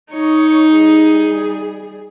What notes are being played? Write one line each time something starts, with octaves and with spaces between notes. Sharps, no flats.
D#4 C#5
G3 G#4